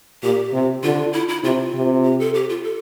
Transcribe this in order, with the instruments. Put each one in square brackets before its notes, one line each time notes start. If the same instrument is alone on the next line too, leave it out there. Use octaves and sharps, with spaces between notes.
[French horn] A#2 [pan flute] G4
[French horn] C3
[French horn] D3 [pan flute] F4
[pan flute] E4
E4
[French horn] C3 [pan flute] F4
[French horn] C3
[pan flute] G4
A4
G4
F4
A4